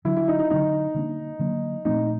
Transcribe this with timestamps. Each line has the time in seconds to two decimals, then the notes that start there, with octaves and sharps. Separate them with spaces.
0.05 D3 F#3 A#3 D4 E4
0.17 E4
0.28 D#4
0.39 D#4
0.50 D3 F#3 A#3 D4 D#4
0.94 D3 F#3 A#3 D4
1.39 D3 F#3 A#3 D4
1.85 A#2 F3 A3 C4 D#4